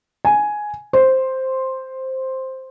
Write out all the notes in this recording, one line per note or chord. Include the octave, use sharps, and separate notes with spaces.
G#5
C5